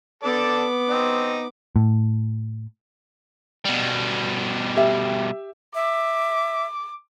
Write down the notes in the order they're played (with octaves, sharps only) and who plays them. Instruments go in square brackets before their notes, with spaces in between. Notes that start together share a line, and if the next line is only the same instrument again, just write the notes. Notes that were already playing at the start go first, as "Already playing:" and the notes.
[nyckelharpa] B3 D6 [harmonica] A4 D5 A5
[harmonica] C4 D#4
[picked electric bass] A2
[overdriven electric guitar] B2 G3
[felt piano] G4 E5
[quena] E5 [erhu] D6